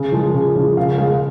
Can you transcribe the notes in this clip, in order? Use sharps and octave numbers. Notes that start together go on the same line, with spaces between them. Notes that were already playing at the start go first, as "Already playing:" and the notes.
Already playing: C#3
F3 G#3
C#3
F3 G#3
C#3 F5
G#3 F5